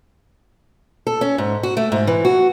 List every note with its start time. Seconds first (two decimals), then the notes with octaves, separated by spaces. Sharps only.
1.07 A4
1.21 C#4
1.38 G#2
1.63 F#4
1.77 A3
1.92 G#2
2.07 E3
2.25 F#4